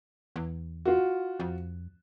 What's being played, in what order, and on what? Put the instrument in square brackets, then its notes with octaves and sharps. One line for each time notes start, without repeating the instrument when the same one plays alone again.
[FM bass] E2
[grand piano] F4 F#4
[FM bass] F2